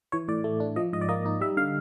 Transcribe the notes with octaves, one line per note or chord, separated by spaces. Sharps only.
E3 C#5
A2 D5
A3
D4
F3 D#5
G#2 D#5
D5
A#3 D#5
D#4
G3 E5
D3 F5